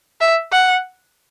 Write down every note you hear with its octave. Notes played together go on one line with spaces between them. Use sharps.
E5
F#5